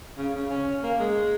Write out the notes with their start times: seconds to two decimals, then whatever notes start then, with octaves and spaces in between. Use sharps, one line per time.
0.18 C#3
0.34 C#3
0.50 C#4
0.83 A#3
0.99 G#3